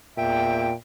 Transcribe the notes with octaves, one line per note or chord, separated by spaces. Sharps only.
E2 A#2 E5 G5